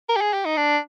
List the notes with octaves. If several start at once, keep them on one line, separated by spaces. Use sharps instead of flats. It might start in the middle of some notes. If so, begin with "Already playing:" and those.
A#4
G4
G#4
G4
D#4
D4